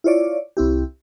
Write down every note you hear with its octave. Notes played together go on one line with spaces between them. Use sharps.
E4 F4 C#5 D5
C2 C4 E4 G4